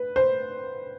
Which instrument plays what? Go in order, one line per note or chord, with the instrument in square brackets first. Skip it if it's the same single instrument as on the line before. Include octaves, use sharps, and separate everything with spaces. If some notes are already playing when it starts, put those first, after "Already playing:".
Already playing: [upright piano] B4
C5